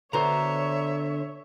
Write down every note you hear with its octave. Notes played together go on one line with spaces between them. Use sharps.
D3 B3 F#4 C5 C#5 E5 A#5